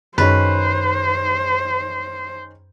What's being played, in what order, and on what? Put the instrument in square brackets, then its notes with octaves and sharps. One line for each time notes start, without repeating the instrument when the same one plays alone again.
[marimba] F#2 [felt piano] D#3 G#3 C#4 [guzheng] B4 [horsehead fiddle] C5